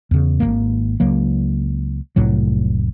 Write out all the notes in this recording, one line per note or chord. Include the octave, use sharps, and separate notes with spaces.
E2 C#3
G#1 E2 A#3
C#2 F#3 A#3
F1 C2 A2 F#3